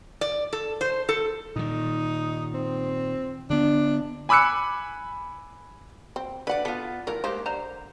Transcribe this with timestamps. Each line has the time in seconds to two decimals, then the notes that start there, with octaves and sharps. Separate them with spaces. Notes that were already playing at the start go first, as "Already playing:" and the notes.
0.21 D5
0.53 A4
0.81 C5
1.09 A4
1.56 A#2 D#3 D#4
2.54 C4
3.50 D3 B3 D4
4.29 G#5 B5 D6 E6 F#6 C#7
6.16 C4
6.47 D3 B4 D5 F#5
6.65 B3 F4 A4
7.07 E3 A3 F4 A#4
7.24 G#3 A#3 G4 C5
7.46 D3 A#4 C5 A#5